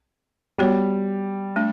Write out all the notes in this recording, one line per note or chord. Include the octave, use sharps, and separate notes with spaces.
G3 B3 F#4 C#5
A3 D4